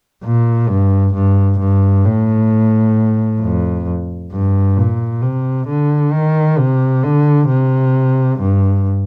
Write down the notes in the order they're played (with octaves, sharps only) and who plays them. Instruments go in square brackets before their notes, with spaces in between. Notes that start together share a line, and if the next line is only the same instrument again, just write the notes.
[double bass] A#2
G2
G2
G2
A2
F2
G2
A#2
C3
D3
D#3
C3
D3
C3
G2